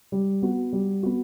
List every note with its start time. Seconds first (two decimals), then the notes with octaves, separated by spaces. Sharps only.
0.12 G3
0.42 B3 F#4
0.73 G3
1.03 B3 F#4